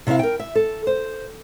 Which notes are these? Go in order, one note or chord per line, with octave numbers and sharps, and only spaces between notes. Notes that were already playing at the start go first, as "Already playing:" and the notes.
C3 E4 C#5 E5 F5
A#4 G5
E5
A4
C5